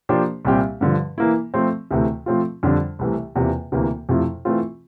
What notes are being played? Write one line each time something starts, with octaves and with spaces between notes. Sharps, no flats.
F3 A#3 D4 G4 C5
C2 A#2 G3 C4 G4
G2 D3 F3
E3 A#3 E4
F3 A3 C4
D2 C3 E3 A3
F3 A3 C4 F4
F2 D3 G3 D4
C2 C3 E3 A3
E2 C3 E3 A#3 F4
D2 C3 E3 A#3
F2 C3 F3 A3 E4
E3 A3 C4 F4